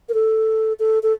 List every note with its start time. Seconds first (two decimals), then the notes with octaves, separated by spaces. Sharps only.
0.09 A#4
0.14 A4
0.79 A4
1.03 A4